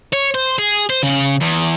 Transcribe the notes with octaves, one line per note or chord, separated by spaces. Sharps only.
C#5
C5
G#4
C5
C#3
E2